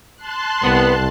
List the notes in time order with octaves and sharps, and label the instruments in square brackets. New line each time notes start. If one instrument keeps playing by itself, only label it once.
[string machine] A5 C6 F#6
[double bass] C2 [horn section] B3